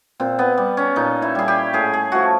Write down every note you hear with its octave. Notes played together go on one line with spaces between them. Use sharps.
A#2 C4
B3
G3
C#4
A#2 D#4
E4
G3 G#4
G4
A2 G#4
G#4
F3 A3 F#4